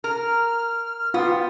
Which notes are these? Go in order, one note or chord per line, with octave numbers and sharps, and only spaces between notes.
A#4 F6
B3 F4 G5